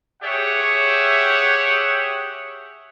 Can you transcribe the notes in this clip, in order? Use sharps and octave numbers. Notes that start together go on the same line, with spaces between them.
G4 G#4 C#5 E5 F#5